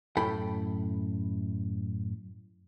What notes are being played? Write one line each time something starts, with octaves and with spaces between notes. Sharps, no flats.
F#2 A2 E4 A4 G5 B5